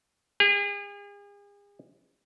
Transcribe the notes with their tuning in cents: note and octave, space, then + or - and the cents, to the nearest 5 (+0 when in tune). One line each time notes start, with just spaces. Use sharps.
G#4 -40